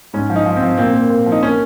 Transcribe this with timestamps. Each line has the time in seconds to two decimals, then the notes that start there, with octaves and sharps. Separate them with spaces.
0.13 G#2 C#4
0.30 F3
0.36 D#4
0.46 F3
0.56 C4
0.62 F3
0.78 A#2 C4
0.94 A#3
1.10 A#2
1.26 F3
1.32 D#4
1.42 A#3 C#4